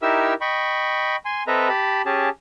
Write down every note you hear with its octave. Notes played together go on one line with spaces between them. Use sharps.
D#4 E4 G4 A#4 E5 E6
D#5 G5 B5 C#6
G#5 C6
C4 A4 B4 D#5 E5 A#5
G4 A5 B5
C#4 G4 G#4 A5